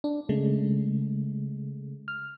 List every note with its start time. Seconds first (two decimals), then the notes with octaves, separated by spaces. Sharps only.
0.04 D4
0.29 C#3 G#3 A3
2.08 F6